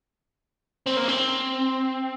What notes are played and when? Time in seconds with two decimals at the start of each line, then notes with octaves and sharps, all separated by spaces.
0.87 C4
0.97 A#3
1.09 C4